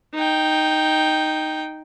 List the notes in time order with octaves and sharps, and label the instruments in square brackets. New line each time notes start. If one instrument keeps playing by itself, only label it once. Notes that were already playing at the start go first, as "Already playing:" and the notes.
[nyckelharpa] D#4 G5